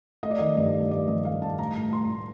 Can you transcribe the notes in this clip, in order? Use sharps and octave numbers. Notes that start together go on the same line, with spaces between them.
A3 D#5
D5
D#3 D#5
G2 D5
A3
A3 D5
G2 D#5
A3 F5
G2 A5
A2 A#5
A2
A2 C6
A2